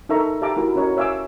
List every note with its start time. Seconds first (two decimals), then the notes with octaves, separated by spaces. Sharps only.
0.09 D#4 A4 A#4 E5 A#5 C#6
0.42 G4 E5 F5 A5 A#5 D6
0.57 E4 F#4 A#4
0.75 C#4 F#4 A#4 C#5 D#5
0.97 C#5 E5 F5 G#5 D6 E6